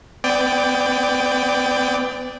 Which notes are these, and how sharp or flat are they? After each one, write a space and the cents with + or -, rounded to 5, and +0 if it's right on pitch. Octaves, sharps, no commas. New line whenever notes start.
B3 +40 D5 +0 G5 +15